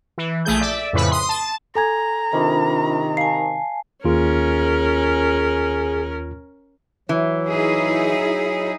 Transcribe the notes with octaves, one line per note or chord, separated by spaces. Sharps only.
E3
A#1 A3 G#4 G6
D5 E5
F2 A2 C#3 E4 B4 B5
C6 D#6
A5
A4 G#5 A#5 G#6
C3 D#3 D4 F4 B5
F5 G#5 A5 C7
D#2 C#4 F4 G#4 A#4
E3 F#3
D#4 E4 G#4